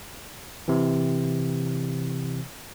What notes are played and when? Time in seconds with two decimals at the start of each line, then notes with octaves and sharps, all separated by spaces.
0.68 C3 E3